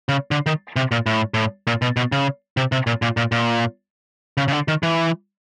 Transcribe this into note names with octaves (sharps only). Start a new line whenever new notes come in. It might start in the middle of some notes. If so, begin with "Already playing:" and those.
C#3
D3
D#3
C3
A#2
A2
A2
A#2
B2
B2
C#3
C3
C3
A#2
A#2
A#2
A#2
C#3
C#3
D3
D#3
E3